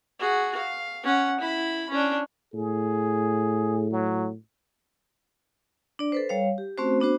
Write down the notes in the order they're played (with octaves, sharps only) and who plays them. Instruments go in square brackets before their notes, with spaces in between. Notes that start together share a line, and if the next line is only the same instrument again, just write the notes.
[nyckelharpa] F#4 G#4
F5
C#4 F#5
E4 B5
C#4 D4
[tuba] A2 [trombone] G#4
[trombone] F#3
[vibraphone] D4 D5
A4 B4 C5
G3 C#5 F5
G4
A3 C4 C#4 F#4 C5
B3 D4 F#4 C5